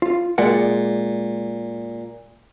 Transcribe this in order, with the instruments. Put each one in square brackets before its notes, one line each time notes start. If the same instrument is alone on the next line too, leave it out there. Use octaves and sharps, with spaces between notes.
[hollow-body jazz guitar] F4
[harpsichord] A#2 [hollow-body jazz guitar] G#3 D5 F#5